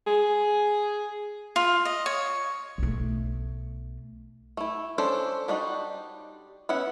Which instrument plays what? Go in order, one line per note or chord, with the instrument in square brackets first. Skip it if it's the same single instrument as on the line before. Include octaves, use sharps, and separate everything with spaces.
[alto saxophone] G#4
[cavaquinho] F4
D#5
C#5
[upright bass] B1 A3
[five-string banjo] A3 E4
C#4 D4 A4 C5
G3 D4 D#4 F#4
B3 C#4 E5 F#5